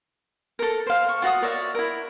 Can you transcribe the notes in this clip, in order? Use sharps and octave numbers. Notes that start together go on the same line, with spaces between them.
A4 A#4
C5 F5
C#6
F4 F#4 A5 D#6
A#4 C#5 D5 E5
E4 A#4